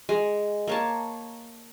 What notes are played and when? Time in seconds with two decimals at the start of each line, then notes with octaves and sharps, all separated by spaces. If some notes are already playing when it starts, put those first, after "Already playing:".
0.09 G#3
0.67 A#3 C#5 A5